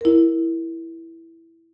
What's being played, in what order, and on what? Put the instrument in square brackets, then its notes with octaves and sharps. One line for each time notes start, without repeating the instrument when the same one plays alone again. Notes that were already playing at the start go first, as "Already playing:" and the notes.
[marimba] E4 A#4